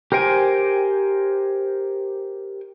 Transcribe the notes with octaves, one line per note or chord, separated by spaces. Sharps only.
G4 A#4 C5 G5 G#5